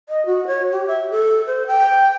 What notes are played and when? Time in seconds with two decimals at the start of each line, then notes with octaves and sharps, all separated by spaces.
0.09 D#5
0.26 F#4
0.47 C#5
0.72 G4
0.87 E5
1.11 A4
1.47 C5
1.67 G5